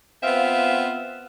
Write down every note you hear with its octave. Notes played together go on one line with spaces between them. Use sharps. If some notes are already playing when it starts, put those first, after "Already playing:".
B3 C4 F4 E5 F5